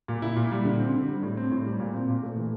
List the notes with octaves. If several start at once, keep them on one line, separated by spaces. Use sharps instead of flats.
A#2
E4
A#2
G3
D3
C4
D3
G3
A2
C4
A2
G3
A#2
C4
A#2
A3
E3